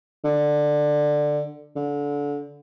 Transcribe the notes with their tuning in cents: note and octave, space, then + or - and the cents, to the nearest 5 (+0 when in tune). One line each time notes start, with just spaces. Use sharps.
D3 +10
D3 -25